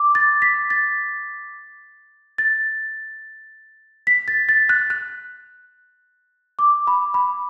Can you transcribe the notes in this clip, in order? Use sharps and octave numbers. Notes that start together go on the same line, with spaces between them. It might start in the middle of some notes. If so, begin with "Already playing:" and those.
Already playing: D6
A6
B6
A6
A6
B6
A6
A6
F#6
F#6
D6
B5
B5